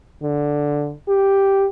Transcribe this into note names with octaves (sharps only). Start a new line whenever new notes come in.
D3
G4